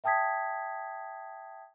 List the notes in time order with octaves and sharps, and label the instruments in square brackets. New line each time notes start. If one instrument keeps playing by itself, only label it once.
[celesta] E5 G5 A5 D#6 G#6 B6